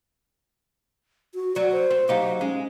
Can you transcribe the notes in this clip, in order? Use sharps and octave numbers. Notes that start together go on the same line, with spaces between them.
F#4
F#3 D5
C5
C4
F#3 D#4 G4 F5
G#3 C#4